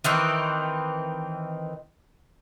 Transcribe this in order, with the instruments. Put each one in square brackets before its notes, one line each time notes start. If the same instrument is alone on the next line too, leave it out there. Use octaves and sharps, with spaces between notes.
[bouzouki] D#3 E3 C4 D#4